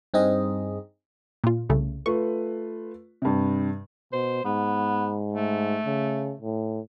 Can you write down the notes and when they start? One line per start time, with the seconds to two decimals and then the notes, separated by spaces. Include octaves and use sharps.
0.14 G2 C4 D#4 G#4 D#5
1.44 A#2 F4
1.69 C2 C#3 A3
2.06 A3 F4 B4 C#6
3.22 G2 C3
4.13 B2 C5
4.45 G#2 B3
5.33 A3
5.86 C#3
6.41 A2